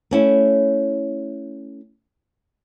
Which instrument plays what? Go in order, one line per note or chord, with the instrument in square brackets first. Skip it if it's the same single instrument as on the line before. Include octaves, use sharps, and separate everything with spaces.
[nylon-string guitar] A3 C#4 E4